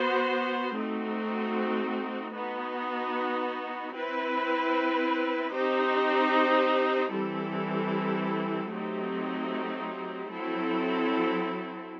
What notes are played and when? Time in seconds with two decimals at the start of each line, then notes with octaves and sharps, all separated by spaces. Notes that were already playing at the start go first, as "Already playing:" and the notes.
Already playing: B3 F#4 C5
0.76 A3 C4 D#4 F#4
2.35 B3 D#4 F#4
3.95 C4 E4 B4
5.54 C4 D#4 G4 C5
7.12 E3 G3 C4 E4 A4
8.72 F#3 A3 C4 D#4 G4
10.31 F#3 C4 E4 A4